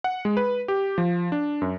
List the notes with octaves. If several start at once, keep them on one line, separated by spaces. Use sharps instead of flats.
F#5
G#3
B4
G4
F3
D4
F#2